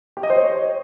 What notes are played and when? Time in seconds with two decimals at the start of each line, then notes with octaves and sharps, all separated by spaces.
0.17 G4
0.23 D#5
0.30 C5
0.36 C#5